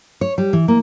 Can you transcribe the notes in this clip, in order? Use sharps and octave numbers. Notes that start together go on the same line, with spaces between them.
C#5
G3
E3
A#3